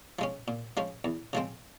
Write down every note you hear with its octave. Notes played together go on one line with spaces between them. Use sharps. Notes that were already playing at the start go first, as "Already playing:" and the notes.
F3 G#3 C#4
A#2
F3 G#3 C#4
E2
C#3 F3 G#3 C4